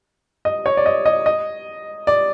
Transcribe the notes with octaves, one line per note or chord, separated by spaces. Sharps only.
D#5
C#5
D5
D#5
D#5
D#5
D5